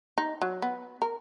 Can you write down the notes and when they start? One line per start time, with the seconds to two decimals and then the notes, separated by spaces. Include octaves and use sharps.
0.18 D#4
0.42 F#3
0.62 B3
1.02 A#4